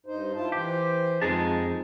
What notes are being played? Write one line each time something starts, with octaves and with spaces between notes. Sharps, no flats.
G2 D#4 C5
E4 F4 A5
E3 G4 C5
F2 F3 G#3 D#4 A5